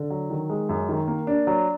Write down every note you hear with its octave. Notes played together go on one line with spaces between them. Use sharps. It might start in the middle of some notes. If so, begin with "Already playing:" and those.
Already playing: D3
F#3
D#3
G#3
F#2
D#3
A#3
D4
F#3